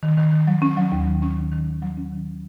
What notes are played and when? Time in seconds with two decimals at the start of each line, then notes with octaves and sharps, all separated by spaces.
0.03 D#3
0.17 D#3
0.32 D#3
0.47 F#3
0.62 C#4
0.77 F#3
0.92 D#2
1.07 D#3
1.22 C#4
1.37 D#3
1.52 D#3
1.67 D#3
1.82 F#3
1.97 C#4
2.12 D#3